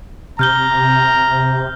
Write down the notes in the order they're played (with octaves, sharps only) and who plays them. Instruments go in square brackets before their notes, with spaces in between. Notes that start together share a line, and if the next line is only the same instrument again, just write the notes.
[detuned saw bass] C3 [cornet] A#5 [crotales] F6 G6 G7